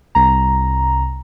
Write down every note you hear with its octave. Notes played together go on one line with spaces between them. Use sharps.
C2 A#5